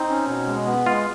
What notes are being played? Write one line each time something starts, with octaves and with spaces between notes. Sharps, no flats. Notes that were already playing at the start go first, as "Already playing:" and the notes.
Already playing: C4 D#4
C#4
B2
G#3
B3
G#3 F4